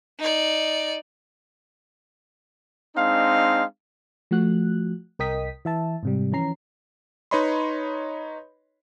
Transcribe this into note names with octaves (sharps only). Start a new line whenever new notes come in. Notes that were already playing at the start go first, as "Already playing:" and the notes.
D#4 D5
G#3 C4 D4 D#4 F5
F3 A3 F#4 F#6
C2 A#4 D#5 G5 D#6 B6
E3 E5 A5
G#2 C3 G3
E3 F3 C#4 A#5 C7
D#4 B4 C#5 D#5 B5 C6